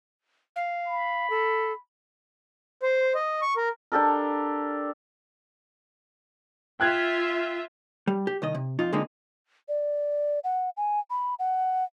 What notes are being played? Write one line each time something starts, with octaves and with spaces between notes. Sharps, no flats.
F5
B5
A4
C5
D#5
C#6
A#4
D4 G4 A4 A#4
F4 E5 G5 F#6 G#6
G3
G4
C2 D#3 D#5
C3
F2 D#4 F4
D3 F3 G#3 A#3 C4 D#4
D5
F#5
G#5
B5
F#5